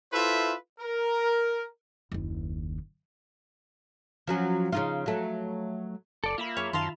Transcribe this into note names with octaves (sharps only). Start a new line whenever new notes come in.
E4 F4 A4 B4 C5 E5
A#4
F#1 D#2
F3 F#3 C#4
C#3 D#4 F4
F#3 A3
F#1 A4 D5
A#3 F4 E5 B5
F#2 G#4 C#5
F#2 D#3 F5 A5 A#5 C6